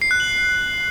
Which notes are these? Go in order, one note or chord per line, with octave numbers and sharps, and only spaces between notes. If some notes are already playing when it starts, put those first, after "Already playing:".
C7
F#6
F#7